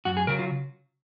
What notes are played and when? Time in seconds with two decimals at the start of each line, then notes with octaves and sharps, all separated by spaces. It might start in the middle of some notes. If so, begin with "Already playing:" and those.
0.05 F#2 F#4
0.17 G#4
0.27 C#3 F#3 A#4
0.39 F4